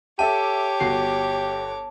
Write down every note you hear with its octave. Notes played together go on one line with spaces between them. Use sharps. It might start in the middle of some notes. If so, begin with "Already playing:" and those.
G4 A4 C#5 E5 G5 A5 D6
G1 F#4 C7